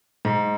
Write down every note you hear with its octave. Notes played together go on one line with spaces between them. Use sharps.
G#2